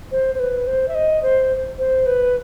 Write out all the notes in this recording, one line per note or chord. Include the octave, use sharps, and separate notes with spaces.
C5
C5
B4
C5
E5
D#5
C5
C5
B4